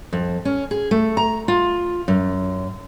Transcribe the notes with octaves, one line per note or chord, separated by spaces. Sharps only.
F2
C#4
G#4
A3
A#5
F4
F#2